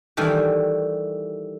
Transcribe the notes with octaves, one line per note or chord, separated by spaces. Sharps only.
D#3 E3 G3 A3